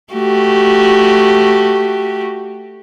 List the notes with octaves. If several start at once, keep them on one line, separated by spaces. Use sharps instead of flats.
A3 F#4 G4